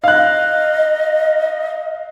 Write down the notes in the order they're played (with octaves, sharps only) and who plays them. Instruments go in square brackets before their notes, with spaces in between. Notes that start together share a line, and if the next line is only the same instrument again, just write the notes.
[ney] D#5 [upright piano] F5 F#6